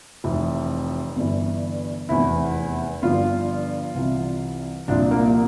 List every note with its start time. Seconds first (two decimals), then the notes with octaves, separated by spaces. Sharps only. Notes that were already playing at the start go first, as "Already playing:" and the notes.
0.24 F1 F2 E3
1.16 G1 G2 E3
2.09 F1 E2 E3 E4
3.02 G1 G2 F3 F4
3.95 C2 C3 E3
4.88 C2 A#2 F3 D4
5.11 A#3